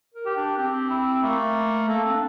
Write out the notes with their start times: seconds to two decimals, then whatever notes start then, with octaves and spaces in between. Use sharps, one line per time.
0.14 A#4
0.26 G4
0.36 D4
0.57 C4 G4
0.90 E4
1.22 A3 A#3
1.88 A#3 A4
2.05 C4
2.13 D4